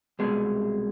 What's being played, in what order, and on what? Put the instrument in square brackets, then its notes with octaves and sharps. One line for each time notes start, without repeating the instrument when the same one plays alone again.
[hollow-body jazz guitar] C2 B2 G#3